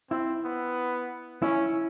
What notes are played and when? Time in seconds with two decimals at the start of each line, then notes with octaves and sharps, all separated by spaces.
0.10 C4 E4
0.44 B3
1.42 C#4 E4